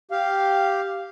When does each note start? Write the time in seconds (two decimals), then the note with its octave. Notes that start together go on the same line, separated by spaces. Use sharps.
0.11 G4 F5